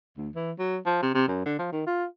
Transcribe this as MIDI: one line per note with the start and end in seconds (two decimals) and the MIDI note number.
0.17 0.30 38
0.35 0.52 52
0.59 0.77 54
0.86 0.99 53
1.02 1.11 48
1.15 1.26 48
1.28 1.43 42
1.46 1.56 50
1.59 1.69 53
1.73 1.85 51
1.87 2.05 65